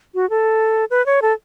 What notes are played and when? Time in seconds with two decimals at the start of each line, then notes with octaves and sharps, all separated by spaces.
0.15 F#4
0.30 A4
0.90 B4
1.06 C#5
1.22 A4